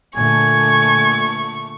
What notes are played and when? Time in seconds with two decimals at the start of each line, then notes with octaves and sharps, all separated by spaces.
0.16 A#2 D3 A3 G#5 C#6